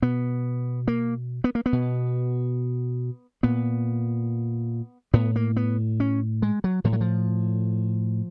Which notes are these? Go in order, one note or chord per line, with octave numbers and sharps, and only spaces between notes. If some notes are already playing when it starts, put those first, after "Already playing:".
B2 B3
A#3
B3
A#3
B3
B2
A#2 B3
A2 B3
A#3
B3
C#4
G#3
F#3
A2 F3
F#3
F3